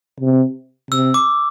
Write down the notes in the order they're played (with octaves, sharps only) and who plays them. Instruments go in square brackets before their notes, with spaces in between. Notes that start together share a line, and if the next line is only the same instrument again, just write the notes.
[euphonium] C3
[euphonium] C3 [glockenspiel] E6
[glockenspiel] D6